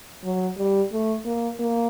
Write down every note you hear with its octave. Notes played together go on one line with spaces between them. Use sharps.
F#3
G3
A3
A#3
A#3